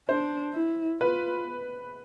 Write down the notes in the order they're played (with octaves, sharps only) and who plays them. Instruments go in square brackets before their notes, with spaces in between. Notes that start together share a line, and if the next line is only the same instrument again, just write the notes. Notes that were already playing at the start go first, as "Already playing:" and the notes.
[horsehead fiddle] D4 [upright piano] C5
[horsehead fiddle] E4
[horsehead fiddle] F4 [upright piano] B4